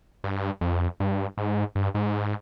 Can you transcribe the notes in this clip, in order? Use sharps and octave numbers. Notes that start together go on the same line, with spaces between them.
G2
F2
G2
G#2
G2
G#2